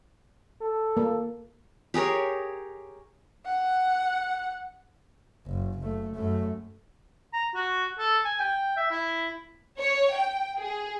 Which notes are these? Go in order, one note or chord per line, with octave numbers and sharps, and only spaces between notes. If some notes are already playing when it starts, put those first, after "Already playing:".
A4
A#3
G4 G#4 A#4 C#5
F#5
F#1
F#1 A3
F#2 A3
A#5
F#4
A4
G#5
G5
E5
E4
C#5
G5
G#4